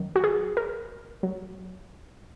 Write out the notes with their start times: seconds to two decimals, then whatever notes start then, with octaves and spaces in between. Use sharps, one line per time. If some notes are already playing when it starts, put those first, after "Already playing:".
Already playing: F#2 D#3 F#3
0.16 F#4
0.24 G#4
0.57 A#4
1.23 F#3